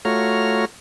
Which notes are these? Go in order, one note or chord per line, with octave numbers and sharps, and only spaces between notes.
A3 F4 F#4 C#5 A#5 F6